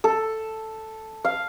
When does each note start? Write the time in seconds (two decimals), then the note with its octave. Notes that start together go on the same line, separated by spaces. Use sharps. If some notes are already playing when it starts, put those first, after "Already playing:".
0.04 A4
1.25 F5